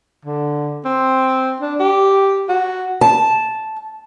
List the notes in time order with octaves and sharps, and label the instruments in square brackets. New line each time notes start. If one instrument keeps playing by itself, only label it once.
[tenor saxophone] D3
C4
D4
G4
F#4
[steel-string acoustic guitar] A5